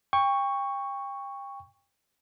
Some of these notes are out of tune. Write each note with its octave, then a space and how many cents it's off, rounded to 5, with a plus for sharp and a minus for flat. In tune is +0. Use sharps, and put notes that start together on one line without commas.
G5 +30 C#6 +0